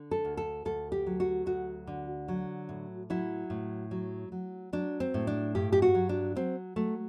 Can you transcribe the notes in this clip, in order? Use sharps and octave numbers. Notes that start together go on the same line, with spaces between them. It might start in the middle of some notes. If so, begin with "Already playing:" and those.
Already playing: D3
A4
D2
A4
D2 A4
G4
F#3
F#4
D2 F#4
D3
F#3
A2
F#3 E4
A2
F#3
F#3
F#3 D4
C4
A2
D4
G2 G4
G4
F#4
F#3
D4
F#3 C4
F#3 A3